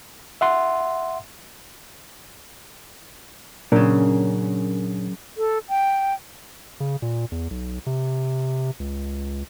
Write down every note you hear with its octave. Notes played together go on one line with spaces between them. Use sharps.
E5 F#5 C6
F#2 A#2 C#3 D4 A#4
A4
G5
C#3
A#2
E2
B1
C3
C#2